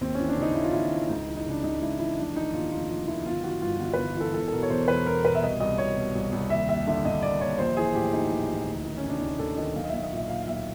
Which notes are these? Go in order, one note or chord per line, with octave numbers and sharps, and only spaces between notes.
D#2 C4
C#4
E3
D4
C#3 D#4
D#2 E4
F4
D#2 E4
E3
C#2 D#4
E3
D#4
C#3 D4
C#2 D#4
C#2 E4
E3 E4
F1 D4
D#3 D#4
D#2 F4
F1 F4
F1 F4
D#3 E4
G1 F4
E3 F#4
G2 F4
G1 F#4
B4
G1
E3 A4
E1 A4
A4
B2 A#4
C#5
E2 C5
E1 B4
E1 A#4
B2 B4
E5
C2 D#5
C2 D#5
B2 C#5
B2
C2
C2
D#2 E5
D#2 E5
D3 E5
D3 D#5
D#2 D5
D#2 C#5
A#1 C5
E3 G#4
A2 G4
A#1 D#4
A#1
E3
D2
D#3
C#4
C3
D4
D2 D#4
D2 A4
D#3 D#5
B1 F5
D#5
E5
B1
D#5
A#2 E5
A#2 F5
F5
B1 E5